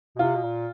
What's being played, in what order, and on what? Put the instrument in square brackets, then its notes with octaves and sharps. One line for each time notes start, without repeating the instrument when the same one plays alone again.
[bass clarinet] B2
[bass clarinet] C3 [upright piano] F4
[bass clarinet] B2
A#2